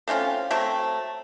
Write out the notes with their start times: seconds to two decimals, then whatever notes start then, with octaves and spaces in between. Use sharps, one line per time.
0.08 A3 C4 C#4 F4
0.50 F#3 A3 C4